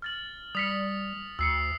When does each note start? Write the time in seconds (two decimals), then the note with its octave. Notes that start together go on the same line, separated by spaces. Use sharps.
0.02 F6 A6 F#7
0.55 G3 D#6 B6 C#7
1.39 D2 E6 C7 C#7